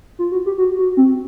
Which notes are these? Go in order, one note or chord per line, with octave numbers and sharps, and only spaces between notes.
F4
F#4
G4
F#4
F#4
C4